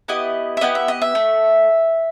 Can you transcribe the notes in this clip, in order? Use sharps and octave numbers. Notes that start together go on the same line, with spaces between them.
B3 E4 G4 D#5
E5
B3 E4 G4 D#5
E5
D#5
E5
A3